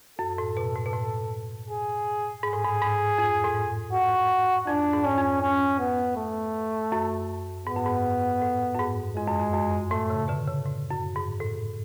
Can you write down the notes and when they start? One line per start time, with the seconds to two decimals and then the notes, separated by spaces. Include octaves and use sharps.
0.19 F#2 A4
0.38 A2
0.57 B2
0.75 A2
0.86 B2
0.93 A2
1.69 G#4
2.43 G#2 G#4
2.53 A2
2.64 G#2
2.81 G#2
3.18 F2
3.44 A2
3.55 G#2
3.93 F#4
4.67 F2 D4
4.93 G#2
5.05 C#4
5.18 F2
5.42 C#4
5.79 B3
6.17 A3
6.92 F#2
7.66 G#2 B3
7.76 F#2
7.86 G#2
8.42 A2
8.74 F#2
8.79 G#2
9.16 F2 G#3
9.28 F#2
9.39 F2
9.53 F#2
9.91 A2 A3
10.10 C#3
10.28 B2 D3
10.47 C#3
10.66 A2
10.91 F#2
11.16 G#2
11.40 A2